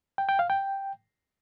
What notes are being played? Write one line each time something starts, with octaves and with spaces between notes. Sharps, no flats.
G5
G5
F5
G5